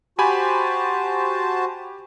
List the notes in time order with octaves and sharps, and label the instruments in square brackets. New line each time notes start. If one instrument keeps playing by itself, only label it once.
[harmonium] F#4 C5 A5 [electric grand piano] G4 G#5 B5